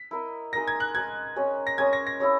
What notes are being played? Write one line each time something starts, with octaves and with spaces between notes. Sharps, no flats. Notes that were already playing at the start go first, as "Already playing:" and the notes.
Already playing: B6
E4 A#4 D#5
G#3 D#4 A#4 D#5 A#6
G#6
F#6
G#3 D#4 A#4 D#5 G#6
G#3 C#4 G#4 C#5
A#6
G#3 C#4 G#4 C#5 G#6
A#6
A#6
E4 G#4 C#5